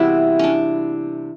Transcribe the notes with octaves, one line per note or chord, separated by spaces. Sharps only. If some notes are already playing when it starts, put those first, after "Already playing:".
Already playing: C3 E3 G3 B3 E4 F#4
C#4 D4